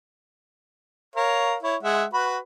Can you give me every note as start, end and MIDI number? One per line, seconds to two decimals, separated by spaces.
1.15 1.56 70
1.15 1.56 73
1.15 1.56 77
1.63 1.76 64
1.63 1.76 73
1.83 2.05 56
1.83 2.05 76
1.83 2.05 78
2.14 2.38 66
2.14 2.38 71
2.14 2.38 83